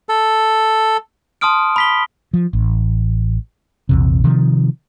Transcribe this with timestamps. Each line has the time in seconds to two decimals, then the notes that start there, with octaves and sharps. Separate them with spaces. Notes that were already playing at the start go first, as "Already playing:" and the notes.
0.09 A4
1.41 A5 C6 D#6 F6 D7
1.76 B5 B6 G7
2.34 F3
2.53 A1
3.89 A#1 E2 C3
4.24 C3 D#3 F3